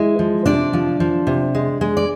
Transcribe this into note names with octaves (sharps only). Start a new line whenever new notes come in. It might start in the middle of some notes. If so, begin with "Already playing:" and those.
Already playing: G#3 E4 E5
F3
C3 D4 D5
F3
F3
C3
G#3
G#3
D5